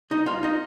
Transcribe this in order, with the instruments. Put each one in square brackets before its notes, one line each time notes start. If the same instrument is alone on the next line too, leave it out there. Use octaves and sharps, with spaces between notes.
[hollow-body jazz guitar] C2 D#4 D#5
C2 F4 F5
D#4 D#5